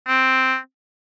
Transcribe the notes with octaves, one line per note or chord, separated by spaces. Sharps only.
C4